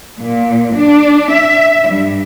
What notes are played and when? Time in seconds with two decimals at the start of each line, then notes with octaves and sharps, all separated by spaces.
0.20 A#2
0.76 D4
1.31 E5
1.89 G2